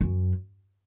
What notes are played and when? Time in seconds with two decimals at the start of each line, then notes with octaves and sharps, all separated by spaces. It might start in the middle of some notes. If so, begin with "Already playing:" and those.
0.01 F#2